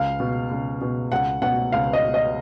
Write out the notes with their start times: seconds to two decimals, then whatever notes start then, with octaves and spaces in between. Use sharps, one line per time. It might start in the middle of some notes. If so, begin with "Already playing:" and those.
Already playing: C#2 F5
0.20 B2
0.51 C#2
0.81 B2
1.12 C#2 F#5
1.42 B2 F#5
1.72 C#2 F5
1.93 D#5
2.03 B2
2.14 D#5